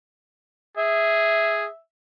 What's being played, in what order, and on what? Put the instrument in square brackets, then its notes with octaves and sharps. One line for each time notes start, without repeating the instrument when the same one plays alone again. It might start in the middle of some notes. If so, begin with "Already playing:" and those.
[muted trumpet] G#4 [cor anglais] E5